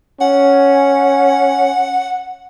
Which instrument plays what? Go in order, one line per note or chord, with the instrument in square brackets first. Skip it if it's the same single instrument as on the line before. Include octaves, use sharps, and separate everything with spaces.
[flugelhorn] C#4 [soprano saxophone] F#5